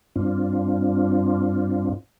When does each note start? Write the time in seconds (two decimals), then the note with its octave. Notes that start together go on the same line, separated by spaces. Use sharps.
0.16 G2 C4 D4 F4